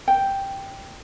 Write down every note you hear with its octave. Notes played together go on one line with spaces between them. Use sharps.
G5